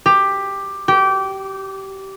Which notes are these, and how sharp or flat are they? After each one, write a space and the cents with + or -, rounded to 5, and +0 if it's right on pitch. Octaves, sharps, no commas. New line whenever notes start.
G4 +10
G4 -20